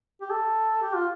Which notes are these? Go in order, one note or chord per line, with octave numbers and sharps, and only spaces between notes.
G4
A4
G4
F4